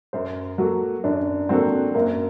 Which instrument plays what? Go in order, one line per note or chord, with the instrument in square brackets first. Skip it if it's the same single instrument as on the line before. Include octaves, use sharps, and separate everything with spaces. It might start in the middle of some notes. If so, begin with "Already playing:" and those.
[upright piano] F#2 [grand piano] C5
[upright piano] F#3 A#3 F#4 A4
[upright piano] F#2 [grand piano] D4
[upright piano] F#3 A#3 F#4 A4 [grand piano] C4
[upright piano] F#2 [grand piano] A#3